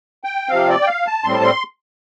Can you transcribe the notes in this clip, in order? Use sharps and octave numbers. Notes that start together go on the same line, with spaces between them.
G5
C3 F3 C4 F5
D5
G5
F5
A5
A2 G3 C4 C6
A5
C6